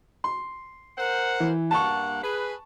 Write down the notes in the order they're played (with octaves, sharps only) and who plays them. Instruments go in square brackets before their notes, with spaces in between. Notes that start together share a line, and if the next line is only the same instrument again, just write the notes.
[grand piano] C6
[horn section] A#4 C5 F#5
[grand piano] E3
[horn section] G2 A#3 F#5 [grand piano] A5 C#6
[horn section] G#4 B4